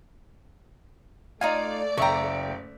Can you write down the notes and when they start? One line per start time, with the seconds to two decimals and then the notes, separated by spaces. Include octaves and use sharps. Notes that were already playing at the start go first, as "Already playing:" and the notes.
1.41 A3 D#4 F4 D5 F5 G#5
1.97 F#1 E5 G5 A#5 C#6